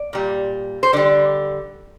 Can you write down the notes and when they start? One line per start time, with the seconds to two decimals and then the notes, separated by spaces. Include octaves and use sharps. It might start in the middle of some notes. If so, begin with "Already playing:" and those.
Already playing: D5
0.13 A#2 G3
0.83 C5
0.93 D3 G3 D5